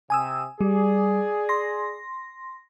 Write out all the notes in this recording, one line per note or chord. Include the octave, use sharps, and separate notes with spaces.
C3 G#5 D#6 E6
G3 G#4 D5
C6 A#6